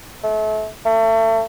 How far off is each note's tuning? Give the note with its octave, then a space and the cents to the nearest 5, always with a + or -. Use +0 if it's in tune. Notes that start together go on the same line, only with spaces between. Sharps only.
A3 -35
A3 +35